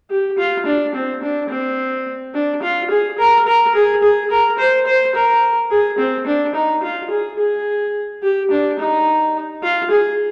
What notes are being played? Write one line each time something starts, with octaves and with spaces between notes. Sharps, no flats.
G4
F4
D4
C4
D4
C4
D4
F4
G#4
A#4
A#4
G#4
G#4
A#4
C5
C5
A#4
G#4
C4
D4
D#4
F4
G#4
G#4
G4
D4
D#4
F4
G#4